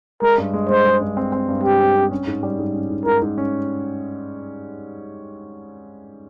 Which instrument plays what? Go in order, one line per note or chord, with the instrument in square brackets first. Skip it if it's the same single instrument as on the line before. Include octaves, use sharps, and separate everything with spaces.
[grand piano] G#3 [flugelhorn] A#4
[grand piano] G2
G#3
[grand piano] G#3 [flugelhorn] C5
[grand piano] G#3
G2
C4
C4
G2
[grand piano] G2 [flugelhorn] G4
[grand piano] C4
C4
C#4
G#2
G3
G#2
C#4
G#2
[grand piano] G#2 [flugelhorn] A#4
[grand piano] G#2
C#4